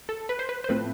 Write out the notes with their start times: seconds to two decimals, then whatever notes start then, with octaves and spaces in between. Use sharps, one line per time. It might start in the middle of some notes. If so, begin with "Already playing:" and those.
0.09 A4
0.29 B4
0.39 C5
0.49 B4
0.64 C5
0.69 A2 F3 A3 C4 B4